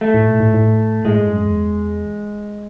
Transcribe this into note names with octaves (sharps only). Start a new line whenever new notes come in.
A3
A2
A#2
A2
A2
A2 G#3
G2
F#2
E2